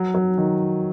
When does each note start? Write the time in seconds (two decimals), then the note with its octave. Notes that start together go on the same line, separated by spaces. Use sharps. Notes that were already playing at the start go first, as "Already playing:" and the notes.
Already playing: F#3
0.15 F#3
0.38 D#3